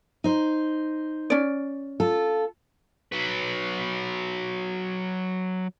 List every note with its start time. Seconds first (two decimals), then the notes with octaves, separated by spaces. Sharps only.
0.24 D#4 C5
1.30 C#4 D5
2.00 F4 A4
3.12 F#3 B4